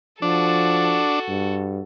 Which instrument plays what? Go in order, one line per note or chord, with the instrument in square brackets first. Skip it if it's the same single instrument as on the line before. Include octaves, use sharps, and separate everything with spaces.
[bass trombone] F3 [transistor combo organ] D4 [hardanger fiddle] F#4 A4
[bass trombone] G2